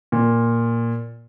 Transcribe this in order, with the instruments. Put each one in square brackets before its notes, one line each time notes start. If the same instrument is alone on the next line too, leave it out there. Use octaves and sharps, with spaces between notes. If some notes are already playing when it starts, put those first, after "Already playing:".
[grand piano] A#2